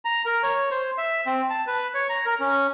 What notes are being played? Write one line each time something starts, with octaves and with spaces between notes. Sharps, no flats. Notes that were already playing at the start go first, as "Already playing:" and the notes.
A#5
A#4
C#5
C5
E5
C4
A5
B4
C#5
A#5
A#4
C#4